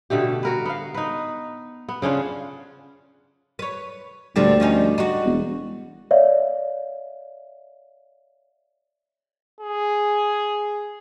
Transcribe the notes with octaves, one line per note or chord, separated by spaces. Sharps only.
B2 D3 A3 G4
F#4 A#4 B4
B3 F5
D#4 B4
B3
C#3 C#4 D4 F4
B4 C#5
D2 A#2 D3 G3 A3
F3 C#4 D#4
D#4 F#4
E1
C#5 D5 E5 F5
G#4